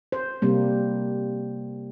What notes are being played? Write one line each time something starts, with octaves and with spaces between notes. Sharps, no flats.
C5
C3 G3 A#3